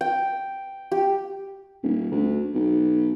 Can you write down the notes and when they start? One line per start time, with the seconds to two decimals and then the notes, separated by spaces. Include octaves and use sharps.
0.01 G5
0.92 G4
1.84 D#1
2.11 D2
2.55 B1